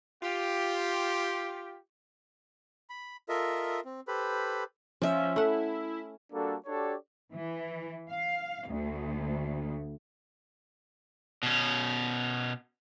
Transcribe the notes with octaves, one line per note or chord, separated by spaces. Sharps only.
F4 G4
B5
F4 A4 A#4 D#5 E5
C4
G4 A4 B4 C5 B5
F3 C#4 E5
F3
A3 E4 F#5
G3 A#3 D4 F#4 A4
D4 F#4 G4 A4 C#5 D5
E3
F5
D2
B2 C#4